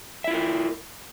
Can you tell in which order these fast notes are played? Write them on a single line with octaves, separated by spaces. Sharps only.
E5 E4 F4 A#4